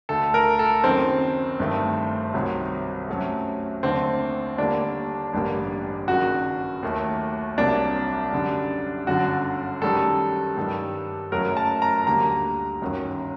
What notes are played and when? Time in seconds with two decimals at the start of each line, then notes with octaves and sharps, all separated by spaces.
0.09 D2 D3 A3 A4
0.34 A#4
0.59 A4
0.84 F#1 F#2 D#3 C4
1.59 G1 G2 D#3 A3
2.34 C2 C3 D#3 F#3
3.09 F#2 F#3 A3
3.83 D#2 D3 A3 C4
4.58 D#2 D3 G3 A#3 D4
5.33 A1 G2 D3 G3 A#3
6.08 F#1 F#2 D#3 F#4
6.83 D#2 D#3 F#3 A3
7.58 C2 C3 F#3 A#3 D4
8.32 F#2 D3 G3
9.07 G1 F#2 D3 F#4
9.82 F#2 D#3 G3 A4
10.57 G2 D#3 G3
11.32 F#1 F#2 F#3 A3 A#4
11.57 A5
11.82 A#5
12.07 D2 D3 G3 A#3 A#5
12.81 G1 F#2 D#3 F#3